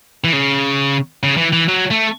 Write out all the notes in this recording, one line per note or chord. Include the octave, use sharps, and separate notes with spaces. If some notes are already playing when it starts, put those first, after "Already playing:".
E3
C#3
C#3
E3
E3
F#3
A3